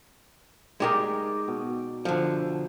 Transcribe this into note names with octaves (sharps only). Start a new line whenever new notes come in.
G#3 D#4 G4 A#4 D5 G5
B2
D3 F3